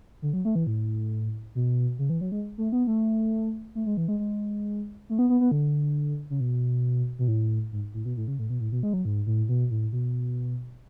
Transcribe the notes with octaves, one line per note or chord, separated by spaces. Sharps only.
D3
F#3
A3
E3
A2
B2
C#3
E3
F#3
G#3
A3
B3
A3
A3
G#3
E3
G#3
G#3
A3
B3
B3
B3
D3
C#3
B2
B2
A2
G#2
A2
B2
A2
C#3
A2
B2
A2
B2
G#3
F#3
G#2
A2
B2
A2
B2